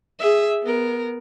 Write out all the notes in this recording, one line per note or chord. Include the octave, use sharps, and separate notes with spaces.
G#4 E5
B3 A#4